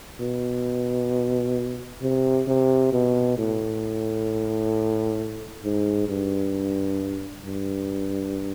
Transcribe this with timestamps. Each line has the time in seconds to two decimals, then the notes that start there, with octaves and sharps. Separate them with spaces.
0.20 B2
2.02 C3
2.47 C3
2.92 B2
3.38 A2
5.64 G#2
6.09 G2
7.45 G2